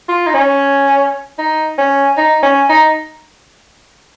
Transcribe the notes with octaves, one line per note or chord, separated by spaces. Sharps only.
F4
D#4
C#4
D#4
C#4
D#4
C#4
D#4